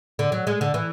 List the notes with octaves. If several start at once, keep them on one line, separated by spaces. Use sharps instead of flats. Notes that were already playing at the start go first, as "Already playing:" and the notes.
D3
F#3
G#3
D3
E3